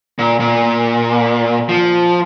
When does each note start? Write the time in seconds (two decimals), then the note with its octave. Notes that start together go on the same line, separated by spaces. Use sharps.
0.19 A#2
0.40 A#2
1.69 F3